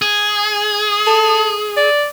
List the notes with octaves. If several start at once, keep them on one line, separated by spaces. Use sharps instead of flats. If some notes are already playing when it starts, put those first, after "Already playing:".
G#4
A4
D5